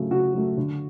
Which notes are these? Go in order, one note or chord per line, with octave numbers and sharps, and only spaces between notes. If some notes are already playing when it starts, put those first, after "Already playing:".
Already playing: C#3 F#3 A3
C#3 F#4
F#3 A3
D3